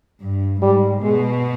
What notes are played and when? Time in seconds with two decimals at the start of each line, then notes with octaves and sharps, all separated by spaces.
0.21 G2
0.62 G#2 G3
1.03 B2 G#3